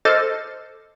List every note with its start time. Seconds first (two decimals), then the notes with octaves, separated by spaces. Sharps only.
0.05 A4 C5 D#5 D6 F6 A6